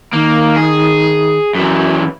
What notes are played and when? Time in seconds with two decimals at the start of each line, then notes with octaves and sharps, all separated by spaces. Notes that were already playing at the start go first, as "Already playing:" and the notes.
0.13 D#3 A#3
0.56 G#4
1.55 F#2 E3 F#4